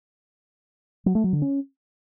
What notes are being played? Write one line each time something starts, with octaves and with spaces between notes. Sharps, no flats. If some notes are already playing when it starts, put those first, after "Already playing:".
F#3
A3
F#3
D3
C#4